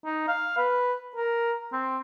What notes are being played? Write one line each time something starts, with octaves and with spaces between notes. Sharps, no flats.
D#4
F5
B4
A#4
C4